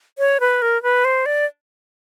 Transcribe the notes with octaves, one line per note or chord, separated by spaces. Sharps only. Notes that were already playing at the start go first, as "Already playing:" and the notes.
C#5
B4
A#4
B4
C5
D5